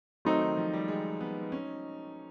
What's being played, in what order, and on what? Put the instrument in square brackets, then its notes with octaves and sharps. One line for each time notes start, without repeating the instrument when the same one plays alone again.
[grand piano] D#3 [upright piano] F#3 A3 C4 D#4
[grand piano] D#3
F3
G3
G#3
B3
C#4